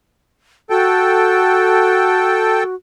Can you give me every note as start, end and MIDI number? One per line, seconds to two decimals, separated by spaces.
0.70 2.75 66
0.70 2.63 69
0.70 2.63 79